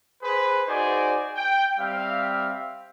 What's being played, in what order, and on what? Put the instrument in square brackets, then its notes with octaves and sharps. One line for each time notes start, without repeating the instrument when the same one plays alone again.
[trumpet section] G#4 B4 C5
D#4 F#4 G#4 C5 D5 G#5
G5
G3 C4 E5 F5